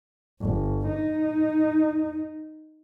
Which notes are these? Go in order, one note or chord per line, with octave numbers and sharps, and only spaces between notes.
G1
D#4